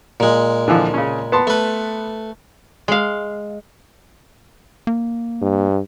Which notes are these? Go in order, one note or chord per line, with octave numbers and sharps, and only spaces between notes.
A#2 G#3
D3 E3 F3
C#3 C#4
B3 A5 C6
A3 B4
G#3 F5
A#3
G2